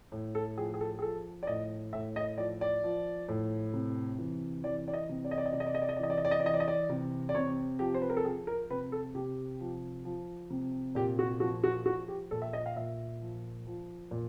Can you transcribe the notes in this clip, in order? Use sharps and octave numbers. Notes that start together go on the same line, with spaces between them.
A2
A4
F3 G#4
G#4
A4
G#4
F3 A4
D5
A2 D#5
A2 E5
D#5
F3 D5
D5
F3
A2
C3
E3
E3 D5
D5
D#5
C3
D5
D#5
D5
D#5
C3 D5
D#5
D5
D#5
D5
D#5
D5
E3 D#5
D5
D#5
D5
D#5
D5
E3 D#5
D5
D#5
D5
C3
D5
C3 C#5
F3 G4
C5
B4
A#4
A4
F3 G#4
A#4
C3 B4
A4
C3 G4
F3
F3
C3
A#2 G4
F#4
F3 F#4
F#4
F3 F#4
G4
A#2 A4
E5
D#5
F5
A#2 E5
F3
F3
A#2